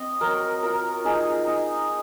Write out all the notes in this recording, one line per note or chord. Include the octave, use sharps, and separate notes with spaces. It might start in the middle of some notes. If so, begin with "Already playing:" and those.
Already playing: C4 D#5
F#3 A#4
F4 A#4
D#4 G#4
D#4